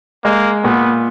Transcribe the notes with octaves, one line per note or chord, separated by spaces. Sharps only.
G#3 A#3
A#2 B3